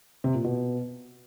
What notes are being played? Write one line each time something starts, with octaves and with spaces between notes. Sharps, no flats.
C3
A#2
B2